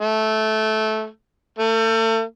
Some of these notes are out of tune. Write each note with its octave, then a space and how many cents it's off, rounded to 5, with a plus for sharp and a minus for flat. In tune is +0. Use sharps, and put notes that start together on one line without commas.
A3 -15
A3 +35